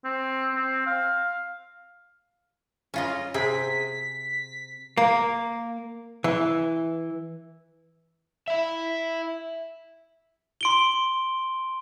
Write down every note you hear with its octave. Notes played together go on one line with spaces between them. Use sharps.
C4
C4
F5
C#4 F4 D#5
C3 C4 G#4 B6
A#3
E3
E4 E5
C6 D7 G7